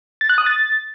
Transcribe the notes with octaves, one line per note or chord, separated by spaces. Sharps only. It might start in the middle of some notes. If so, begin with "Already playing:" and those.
A6
F#6
D#6
A6